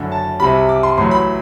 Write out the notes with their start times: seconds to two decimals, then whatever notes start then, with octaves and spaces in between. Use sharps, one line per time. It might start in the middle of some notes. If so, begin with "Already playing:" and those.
Already playing: F#1 F#2 D3
0.12 A5
0.40 C2 C3 G3 B5
0.69 D6
0.83 C6
0.97 A1 A2 F#3 C6
1.11 B5